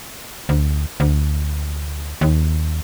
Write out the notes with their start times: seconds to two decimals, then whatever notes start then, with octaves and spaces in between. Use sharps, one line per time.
0.49 D2
1.00 D2
2.21 D#2